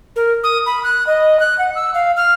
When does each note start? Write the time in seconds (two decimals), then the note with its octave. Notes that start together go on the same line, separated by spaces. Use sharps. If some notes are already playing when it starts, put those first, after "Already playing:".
0.16 A#4
0.44 D#6
0.66 B5
0.84 F#6
1.07 D#5
1.40 F#6
1.58 F#5
1.75 E6
1.94 F5
2.17 F6